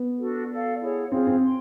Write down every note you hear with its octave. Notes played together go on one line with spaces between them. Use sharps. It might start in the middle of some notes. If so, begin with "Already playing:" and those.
Already playing: B3
D4 F#4 A4
A4 D5 F5
E4 G#4 C#5 F#5
C4 F4 G#4 C5 F5
C4
G5 C6